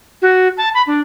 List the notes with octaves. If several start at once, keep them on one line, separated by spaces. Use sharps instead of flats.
F#4
A5
B5
D4